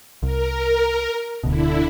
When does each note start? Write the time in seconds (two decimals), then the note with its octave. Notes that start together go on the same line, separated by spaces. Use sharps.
0.23 C2 A#4
1.43 D1 D2 B2 D3 E4